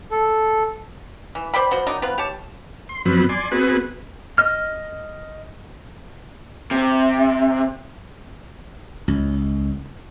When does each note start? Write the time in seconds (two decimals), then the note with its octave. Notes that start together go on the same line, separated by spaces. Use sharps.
0.11 A4
1.35 E3
1.54 C5 D5 G5 B5
1.71 F3 F#4 C5 B5
1.87 D#3 F#3 D4 D#4
2.02 B3 C4 F4 B4
2.18 G4 C#5 A5
2.89 C6
3.05 F#2 F3 F#3 B3 C4 B5
3.29 D5 G#5 C6
3.51 B3 C4 F#4 G#4 B4
4.38 D#5 F6
6.71 C3
9.08 C#2